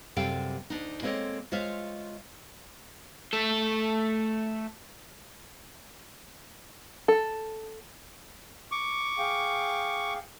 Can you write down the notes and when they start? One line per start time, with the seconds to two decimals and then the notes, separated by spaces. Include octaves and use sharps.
0.16 F#2 C3 G3 A4 F5 G5
0.70 D2 D4 D#4
1.02 G#3 A#3 C4 A4 C#5 D#5
1.52 G#3 F4 C5 C#5 E5 F5
3.33 A3 A4
7.08 A4
8.71 C#6 D6
9.18 G#4 F5 G5